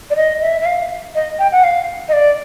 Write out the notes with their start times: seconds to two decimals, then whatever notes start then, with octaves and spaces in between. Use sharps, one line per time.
0.10 D5
0.16 D#5
0.41 E5
0.61 E5
0.66 F5
1.15 D#5
1.39 G5
1.52 F#5
1.64 F5
2.09 D#5
2.13 D5